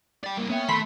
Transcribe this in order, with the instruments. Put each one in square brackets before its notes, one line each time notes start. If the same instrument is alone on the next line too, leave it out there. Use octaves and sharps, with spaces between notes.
[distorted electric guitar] D5 G5
G2 A#3
[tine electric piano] A#3 E5 G5 [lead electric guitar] B3 [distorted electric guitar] C#4
[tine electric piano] D#3 [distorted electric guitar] A3 [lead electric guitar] B3 A5 [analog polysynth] B5 C6 B6